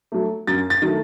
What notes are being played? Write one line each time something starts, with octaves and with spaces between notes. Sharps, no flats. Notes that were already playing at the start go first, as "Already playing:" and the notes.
F#3 A3
F#2 A6
A6
D#3 F#3 A3